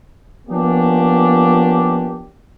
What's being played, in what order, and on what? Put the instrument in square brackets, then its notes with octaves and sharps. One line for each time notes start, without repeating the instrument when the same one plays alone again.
[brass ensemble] F3 A#3 B3 C#4 D4 G4